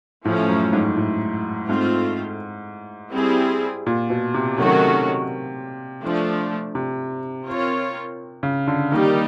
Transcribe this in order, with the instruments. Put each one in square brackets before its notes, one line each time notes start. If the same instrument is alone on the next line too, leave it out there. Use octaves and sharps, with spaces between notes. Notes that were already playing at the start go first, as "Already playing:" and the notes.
[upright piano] A2 [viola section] F3 A3 C#4
[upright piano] F#2
G#2
A2
[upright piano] G#2 [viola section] A3 C4 F4
[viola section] G3 C4 E4 G#4
[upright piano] A#2
B2
C3
[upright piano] C3 [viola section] D#3 F#3 A3 C#4 F#4
[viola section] F3 A3 D4
[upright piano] C3
[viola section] C4 F4 A#4 C#5
[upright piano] C#3
D3
[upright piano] D#3 [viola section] G3 A#3 D#4 G4